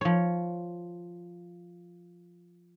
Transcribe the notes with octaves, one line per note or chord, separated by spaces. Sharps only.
F3 C#5